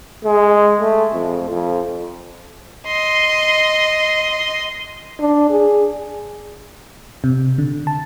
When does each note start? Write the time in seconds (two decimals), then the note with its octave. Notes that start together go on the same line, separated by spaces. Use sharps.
0.25 G#3
0.81 A3
1.13 F2
1.49 F2
2.87 D#5 C6
5.20 D4
5.50 G#4
7.24 C3
7.58 D3
7.87 A5